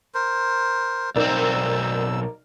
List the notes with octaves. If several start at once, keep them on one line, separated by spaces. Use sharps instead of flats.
A#4 C5
B1 C4 D#4 A#4 D5 E6